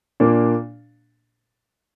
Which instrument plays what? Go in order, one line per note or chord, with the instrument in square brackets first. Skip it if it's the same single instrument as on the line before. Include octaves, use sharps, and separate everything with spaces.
[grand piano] A#2 A#3 D4